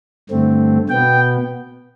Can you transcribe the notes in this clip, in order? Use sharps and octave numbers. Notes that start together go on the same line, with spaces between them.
G2 D3 A3 C4
B2 B3 G5